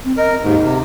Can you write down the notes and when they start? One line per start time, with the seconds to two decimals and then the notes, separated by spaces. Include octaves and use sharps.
0.04 C4
0.17 A#4 D#5
0.43 D#2 G#2 D#4
0.62 C3